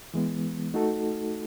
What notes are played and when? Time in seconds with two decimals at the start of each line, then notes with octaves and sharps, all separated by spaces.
0.14 E3 G#3 B3
0.74 A3 D#4 F#4 A4